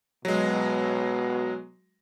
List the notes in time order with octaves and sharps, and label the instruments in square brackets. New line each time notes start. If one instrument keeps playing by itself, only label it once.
[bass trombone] B2 [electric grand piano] F#3 G#3